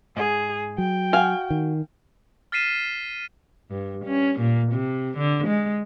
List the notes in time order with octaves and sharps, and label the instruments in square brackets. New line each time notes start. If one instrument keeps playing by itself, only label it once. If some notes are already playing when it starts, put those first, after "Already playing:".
[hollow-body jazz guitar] G#2 [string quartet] G#4
[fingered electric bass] F#3 [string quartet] G5
[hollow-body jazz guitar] F#4 [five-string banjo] F5 G#5
[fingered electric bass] D#3
[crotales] F6 A6 B6 C7 D#7 E7
[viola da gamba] G2
C#4
A#2
C3
D3
G#3